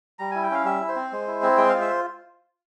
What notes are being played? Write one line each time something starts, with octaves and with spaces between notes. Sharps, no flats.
G3 A#5
E4 G#5
G5
C#4 F5
G3 E5
E4
C5
C4
G#3
E4
C4
G#3 G5
F4 F5
E5